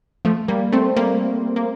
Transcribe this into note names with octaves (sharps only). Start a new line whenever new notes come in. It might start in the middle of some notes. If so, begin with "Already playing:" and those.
F3 A3
G3 A#3
A3 C4
G3 A#3
A#3